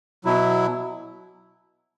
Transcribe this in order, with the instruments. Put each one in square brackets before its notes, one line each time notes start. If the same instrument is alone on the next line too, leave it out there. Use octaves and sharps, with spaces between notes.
[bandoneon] B2 F#3 E4